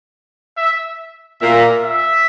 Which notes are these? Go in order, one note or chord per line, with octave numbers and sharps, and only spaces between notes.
E5
A#2 A#3 E5
E5